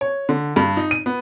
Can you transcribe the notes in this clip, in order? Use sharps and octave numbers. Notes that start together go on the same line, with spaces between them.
C#5
D3
G2
D#4
D#7
B3